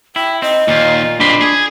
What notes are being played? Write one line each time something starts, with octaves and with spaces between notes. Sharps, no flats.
E4 G5
C4 D#5
D#2 A#2 F4
A#2 C4 D4 B5 C6
G#4